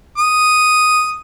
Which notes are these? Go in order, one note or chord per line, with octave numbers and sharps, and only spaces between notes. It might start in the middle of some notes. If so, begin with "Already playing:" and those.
D#6